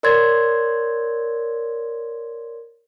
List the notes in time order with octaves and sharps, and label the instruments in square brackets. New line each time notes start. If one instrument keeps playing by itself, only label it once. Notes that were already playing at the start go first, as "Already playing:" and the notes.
[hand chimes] A#4 C#5 D5 C6 G#6 A6